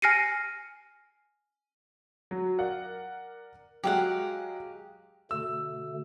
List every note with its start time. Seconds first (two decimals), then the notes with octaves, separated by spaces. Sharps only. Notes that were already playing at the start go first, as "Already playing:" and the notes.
0.02 G#5 F6 A#6 C7 C#7 D#7
2.31 F#3
2.58 A#4 D5 F#5
3.84 F#3 G#3 G4 F5 F#5
5.31 B2 D3 A3 E6